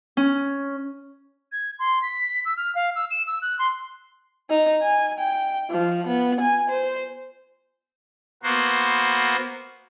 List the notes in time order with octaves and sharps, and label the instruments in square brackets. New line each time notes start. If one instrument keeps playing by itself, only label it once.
[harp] C#4
[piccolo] G#6
C6
B6
E6
F6
F5
E6
E7
E6
F#6
C6
[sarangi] D#4
G#5
G5
F3
B3
G#5
C5
[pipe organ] A#3 B3 F#4 C5